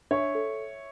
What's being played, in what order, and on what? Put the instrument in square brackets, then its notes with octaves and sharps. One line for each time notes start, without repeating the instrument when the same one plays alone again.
[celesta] D4 [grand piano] C#5 E5
[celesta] A4